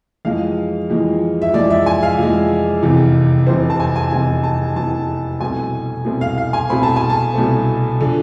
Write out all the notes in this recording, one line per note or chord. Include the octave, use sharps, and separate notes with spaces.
F2 E3 G#3 F5
F2 E3 G#3
E5
F2 E3 G#3 D5
E5
G#5
F5
F2 E3 G#3
F1 E2 C3 E3
F1 E2 C3 E3 C5
A5
G#5
G#5
F1 E2 C3 E3 G#5
A5
F1 E2 C3 E3 A5
C2 B2 A3 C4 G#5
C2 B2 A3 C4
F5
F5
G#5
C2 B2 A3 C4 B5
A5
G#5
A5
C2 B2 A3 C4
D3 F3